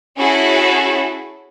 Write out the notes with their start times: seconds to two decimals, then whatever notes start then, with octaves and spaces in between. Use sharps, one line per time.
0.17 C#4 E4 F#4 G#4 A4